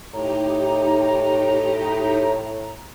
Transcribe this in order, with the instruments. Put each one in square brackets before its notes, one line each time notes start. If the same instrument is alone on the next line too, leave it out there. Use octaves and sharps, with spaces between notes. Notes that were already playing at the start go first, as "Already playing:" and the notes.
[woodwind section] A2 [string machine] D#4 G4 [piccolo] A#5